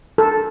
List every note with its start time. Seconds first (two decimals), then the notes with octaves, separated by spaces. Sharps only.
0.18 A4